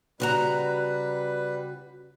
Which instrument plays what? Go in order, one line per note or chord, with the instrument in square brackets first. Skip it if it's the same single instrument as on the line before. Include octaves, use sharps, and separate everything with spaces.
[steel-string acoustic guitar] C#3 F#4 A#5 [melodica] G3 B4